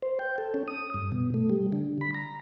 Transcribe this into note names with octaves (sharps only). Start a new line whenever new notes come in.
C5
G5
A4
C#4
D#6
G2
B2
A3
G3
D3
B5
A#5